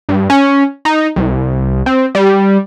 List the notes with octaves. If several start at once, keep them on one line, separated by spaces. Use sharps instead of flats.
G2
C#4
D#4
C2
C4
G3